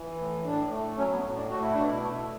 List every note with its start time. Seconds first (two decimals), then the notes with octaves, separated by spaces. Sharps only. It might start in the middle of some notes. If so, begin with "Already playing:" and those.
Already playing: E3
0.18 A2
0.45 A2 D4
0.71 A3
0.98 F#3 C#4
1.11 B3
1.24 A2
1.37 D4
1.50 A3 F#4
1.62 E4
1.74 B2 D4
1.87 E4
2.03 A3